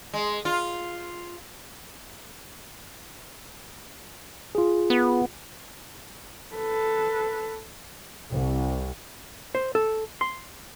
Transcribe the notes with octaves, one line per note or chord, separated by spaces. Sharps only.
G#3
F4
F4 G#4
B3
A4 B4
C2
C5
A4
C6